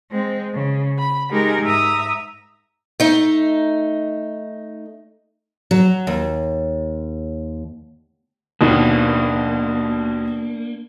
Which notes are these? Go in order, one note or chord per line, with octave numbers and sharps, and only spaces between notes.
G#3 C4
C#3
B5
G#3 D#4 G4 G#4 A#4
G#2 E5 A#5 D#6
A3 D#4
F#3
D#2
D#2 B2 A#3 D4